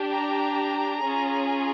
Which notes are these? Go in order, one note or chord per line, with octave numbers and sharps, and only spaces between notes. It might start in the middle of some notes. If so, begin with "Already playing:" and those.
Already playing: D4 G4
A#5
C#4 F4 G#4